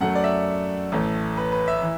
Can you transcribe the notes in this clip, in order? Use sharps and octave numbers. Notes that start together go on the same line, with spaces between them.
F#2 F#3 A3 F#5
D5
E5
A1 A2 A3
B4
B4
E5
E3